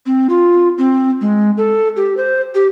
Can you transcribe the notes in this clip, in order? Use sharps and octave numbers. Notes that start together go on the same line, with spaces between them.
C4
F4
C4
G#3
A4
G4
C5
G4